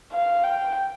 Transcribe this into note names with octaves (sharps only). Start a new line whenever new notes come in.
F5
G5